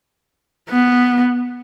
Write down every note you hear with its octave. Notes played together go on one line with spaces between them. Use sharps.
B3